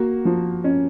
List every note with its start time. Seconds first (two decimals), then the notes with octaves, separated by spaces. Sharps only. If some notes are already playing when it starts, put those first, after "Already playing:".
Already playing: A#3 F#4
0.25 F3
0.64 C#4